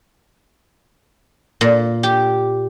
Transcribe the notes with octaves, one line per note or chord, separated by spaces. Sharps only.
A#2
G4